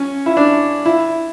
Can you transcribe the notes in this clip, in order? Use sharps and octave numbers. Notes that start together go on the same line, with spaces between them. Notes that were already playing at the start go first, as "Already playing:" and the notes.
Already playing: C#4
E4
D4
E4